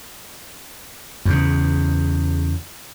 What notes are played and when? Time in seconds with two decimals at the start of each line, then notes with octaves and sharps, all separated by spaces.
1.25 E2 C#3